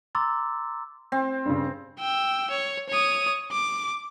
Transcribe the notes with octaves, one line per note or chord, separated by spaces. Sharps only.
A#5 C6 D6 E6 A6
C4
G2 C#3
G5 E6
C#5
C#5 D#6
D6